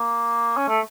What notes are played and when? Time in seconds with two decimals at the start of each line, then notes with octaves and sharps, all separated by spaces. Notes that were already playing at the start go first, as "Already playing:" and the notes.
Already playing: A#3
0.57 C#4
0.68 A3